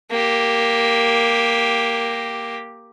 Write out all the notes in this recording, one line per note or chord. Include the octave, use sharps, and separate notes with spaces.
A#3 G4